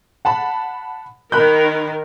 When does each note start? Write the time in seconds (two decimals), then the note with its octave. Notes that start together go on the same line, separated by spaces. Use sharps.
0.25 F#5 A5 B5
1.32 D#3 A#4 B5 F#6 G6